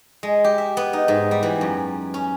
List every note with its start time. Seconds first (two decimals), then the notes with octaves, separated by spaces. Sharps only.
0.23 G#3
0.44 G4
0.58 E5
0.77 B3
0.93 D#4
1.08 G#2
1.31 G3
1.43 E3
1.61 F#2
2.14 C#4